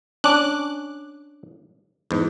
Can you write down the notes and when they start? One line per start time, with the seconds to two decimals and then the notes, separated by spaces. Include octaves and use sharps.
0.24 C#4 D4 D6 F#6
2.11 E2 G#2